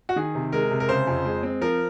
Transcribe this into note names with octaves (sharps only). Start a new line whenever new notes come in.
F#4
D#3 G#4
C3
G#3 A#4
C3
A#4
C#3 C5
F2
G#3
C4
F3 A#4